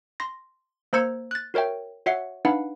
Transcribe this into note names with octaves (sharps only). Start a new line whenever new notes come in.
C6 A#6
A#3 C5 A#5 E6 G#6 C#7
F#6 A6
F#4 A#4 C#5 E5 G5
F#4 C#5 E5 F#5 C7
D4 D#4 B4 F5 F#5 B5